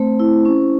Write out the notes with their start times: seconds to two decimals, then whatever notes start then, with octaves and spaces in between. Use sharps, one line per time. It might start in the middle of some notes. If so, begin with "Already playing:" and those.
Already playing: A3 C4 C5
0.19 E4
0.45 C#4